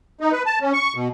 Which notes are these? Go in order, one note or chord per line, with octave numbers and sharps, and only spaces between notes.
D#4
B4
A5
C#4
C#6
B2